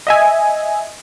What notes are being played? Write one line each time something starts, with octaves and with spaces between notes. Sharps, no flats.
D#5 E5 G#5